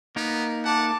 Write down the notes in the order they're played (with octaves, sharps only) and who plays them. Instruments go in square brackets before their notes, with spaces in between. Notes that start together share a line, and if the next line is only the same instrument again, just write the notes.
[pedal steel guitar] A#3 D#4 A#4 [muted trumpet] B3
[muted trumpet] F#5 [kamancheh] A5 D6